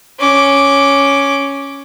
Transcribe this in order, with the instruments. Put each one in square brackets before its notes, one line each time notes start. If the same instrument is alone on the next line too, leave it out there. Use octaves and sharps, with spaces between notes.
[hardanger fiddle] C#4 D6